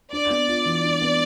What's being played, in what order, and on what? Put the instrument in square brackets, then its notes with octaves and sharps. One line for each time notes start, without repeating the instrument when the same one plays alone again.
[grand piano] D4 [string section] D5
[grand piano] B3
F4
E3
D4
B3